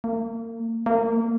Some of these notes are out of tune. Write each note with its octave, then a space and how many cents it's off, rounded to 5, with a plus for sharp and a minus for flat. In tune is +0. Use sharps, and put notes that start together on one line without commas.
A#3 -35
A#3 -25